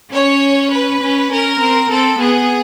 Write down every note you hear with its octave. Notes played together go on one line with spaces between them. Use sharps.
C#4 C#5
B4
C#4
C#4 A#4
C4
C4 A4
B3 G#4